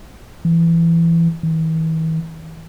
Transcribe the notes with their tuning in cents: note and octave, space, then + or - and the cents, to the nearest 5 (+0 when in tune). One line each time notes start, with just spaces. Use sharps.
E3 +20
E3 -45